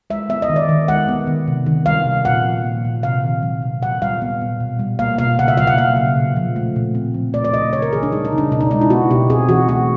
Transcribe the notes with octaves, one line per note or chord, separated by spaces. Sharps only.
G#3 E5
B3 E5
D#5
D#3
D5
D#3
G#3 F#5
B3
D#3
C3
D#3
G3 F5
C3
A#2 F#5
F3
A#3
A#2
C3 F5
D#3
F#3
C3
A#2 F#5
G3 F5
B3
A#2
B2
G3
A#3 F5
B2 F5
C#3 F#5
E5
F#3 F5
F#5
A#3 F5
C#3
A#2
F3
A3
A#2
C4
F3
A3 D5
D5
C#3 D#5
C#3 C#5
A#4
E3 G#4
D4
G3 D#4
D#4
C#3
D4
B2 D#4
D4
G#3 D#4
E4
B3 F#4
B2 G4
C4 G#4
E3 F#4
A3 F#4